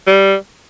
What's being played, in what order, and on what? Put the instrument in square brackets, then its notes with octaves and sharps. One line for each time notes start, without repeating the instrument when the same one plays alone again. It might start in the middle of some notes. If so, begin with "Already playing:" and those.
[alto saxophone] G3